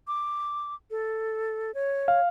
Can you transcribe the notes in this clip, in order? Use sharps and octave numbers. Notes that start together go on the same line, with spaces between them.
D6
A4
C#5
F5